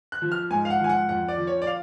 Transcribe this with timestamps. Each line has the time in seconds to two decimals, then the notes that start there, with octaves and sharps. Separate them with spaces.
0.12 F#6
0.22 F3
0.32 F6
0.50 G#2 G#5
0.65 F5
0.70 F#5
0.80 F3 G#5
0.89 F#5
1.09 F2 F#5
1.28 D5
1.37 F3
1.47 C#5
1.62 D5
1.67 F5